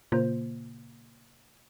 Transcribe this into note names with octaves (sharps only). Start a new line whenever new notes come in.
A#2 C#3 A#3 F4 C5